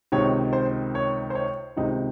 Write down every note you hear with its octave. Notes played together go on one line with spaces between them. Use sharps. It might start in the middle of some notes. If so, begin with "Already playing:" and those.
C#2 C3 D#3 C#5
C5
C#5
C5
C#5
C#2 C3 D#3 D#4